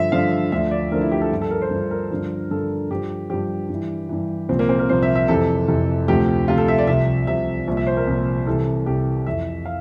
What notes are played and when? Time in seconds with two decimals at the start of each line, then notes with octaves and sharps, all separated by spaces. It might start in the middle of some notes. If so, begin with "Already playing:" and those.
Already playing: G2 D3 F3 E5
0.12 G2 D3 F3 F5
0.52 D2 D3 F3 E5
0.71 D5
0.91 D2 D3 F3 A#4
1.01 E4
1.12 G4
1.21 A4
1.31 G2 F3
1.42 A4
1.51 A#4
1.62 C5
1.71 G2 F3
1.91 A#4
2.11 G2 D3 F3
2.51 G2 D3 F3 A4
2.90 G2 F3 G4
3.30 G2 F3 G4
3.70 G2 E3
4.09 G2 E3
4.49 C2 A#2 F3 C4
4.59 A#3
4.69 C4
4.79 A#4
4.89 C2 A#2 F3 C5
5.03 E5
5.15 E5
5.28 F2 C3 E3 A4
5.68 F2 C3 E3
6.08 D2 C3 F3 G4
6.48 D2 C3 F3 F4
6.58 A4
6.68 E5
6.78 D5
6.87 C2 C3 F3 E5
7.27 C2 C3 F3 E5
7.67 C2 A#2 F3
7.77 E5
7.87 C5
7.97 A#4
8.07 C2 A#2 F3
8.47 C2 C3 E3 A4
8.86 C2 C3 E3 G4
9.26 F2 E3 E5
9.65 F5